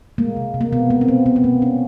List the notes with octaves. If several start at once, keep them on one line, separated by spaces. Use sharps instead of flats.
G#3 A#3
C3
C3
A#3
B2 B3
G#3 A#3
C4
B2 B3
A#3 B3
B3
B2 A#3
B2 C#4